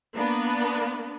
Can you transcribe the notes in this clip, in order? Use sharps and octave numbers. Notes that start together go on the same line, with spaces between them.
A#3 B3 D4